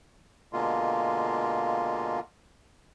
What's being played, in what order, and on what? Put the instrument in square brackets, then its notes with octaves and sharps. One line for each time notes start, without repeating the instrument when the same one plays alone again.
[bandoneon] B2 D3 G#3 A#3 F4